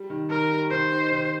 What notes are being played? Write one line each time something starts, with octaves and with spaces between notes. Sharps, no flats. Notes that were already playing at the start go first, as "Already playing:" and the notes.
Already playing: G3
D#3
D#3 A#4
G3
D#3 C5
D#4
D#3